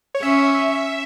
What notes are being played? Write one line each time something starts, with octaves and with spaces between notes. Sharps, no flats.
C#5
C#4 E5